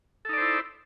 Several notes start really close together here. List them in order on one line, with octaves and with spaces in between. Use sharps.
A4 D#4 D5 C5 E4